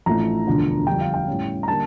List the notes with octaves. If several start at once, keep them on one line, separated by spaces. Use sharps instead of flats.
A1 A2 F3 A3 D4 A#5
E1 D2 D3 F3
F2 D3 G3 D4 G5
F5
G5
A2 G3 C#4
A#5
D3 G3 A#3 A5